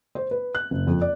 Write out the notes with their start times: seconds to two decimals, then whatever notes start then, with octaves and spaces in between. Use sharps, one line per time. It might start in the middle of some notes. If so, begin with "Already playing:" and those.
0.15 C5
0.31 B4
0.55 F#6
0.71 F#1
0.87 F2
1.01 D5